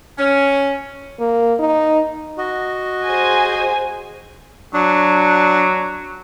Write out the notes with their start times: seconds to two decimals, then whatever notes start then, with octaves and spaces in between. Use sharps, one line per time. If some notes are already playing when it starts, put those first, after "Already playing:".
0.18 C#4
1.19 A#3
1.59 D#4
2.38 F#4 D#5
3.04 G#4 C5 G#5
4.74 F#3 D4